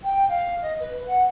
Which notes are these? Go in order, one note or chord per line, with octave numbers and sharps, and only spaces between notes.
G5
F5
D#5
B4
F#5